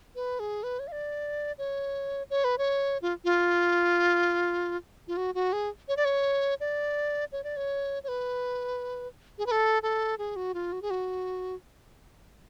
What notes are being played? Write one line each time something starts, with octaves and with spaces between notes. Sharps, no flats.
B4
G#4
B4
C#5
F5
D5
C#5
C#5
B4
C#5
F4
F4
F4
F#4
F#4
G#4
C#5
D5
C#5
D5
C#5
D5
C#5
C#5
B4
G#4
B4
A4
A4
G#4
F#4
F4
F#4
G#4
F#4